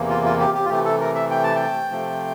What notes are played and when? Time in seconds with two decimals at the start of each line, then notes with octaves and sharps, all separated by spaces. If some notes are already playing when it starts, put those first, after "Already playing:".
Already playing: E2 C3 E3 A#3
0.09 F4
0.25 F4
0.39 G4
0.55 G4
0.65 F4
0.69 C3 E3 A3 G4
0.85 A4
1.00 A#4
1.15 E5
1.31 G5
1.43 A5
1.55 G5
1.91 C3 F3 A3